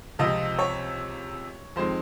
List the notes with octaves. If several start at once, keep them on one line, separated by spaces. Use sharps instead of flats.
C#2 C3 F3 C4 D#5
C#5
F2 D#3 G#3 C4 C5